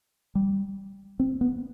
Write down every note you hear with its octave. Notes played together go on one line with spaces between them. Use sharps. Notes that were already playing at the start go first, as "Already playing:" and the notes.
G3
C4
B3